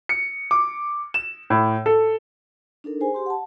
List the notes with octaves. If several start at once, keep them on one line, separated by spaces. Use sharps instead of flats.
C#7
D6
E7
A2
A4
D4 D#4 A4 A#4
G#4 C5 G#5
G4 C6
F#5 A5